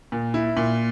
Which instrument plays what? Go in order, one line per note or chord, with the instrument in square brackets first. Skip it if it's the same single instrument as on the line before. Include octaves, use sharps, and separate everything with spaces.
[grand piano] A#2
E4
A#2